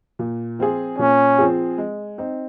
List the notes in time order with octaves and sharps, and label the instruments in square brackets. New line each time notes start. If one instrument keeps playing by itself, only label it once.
[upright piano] A#2
F3 C4 F4 G#4
[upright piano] A#2 [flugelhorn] C#4
[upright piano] F3 C4 F4 G#4
G#3
C4 D#4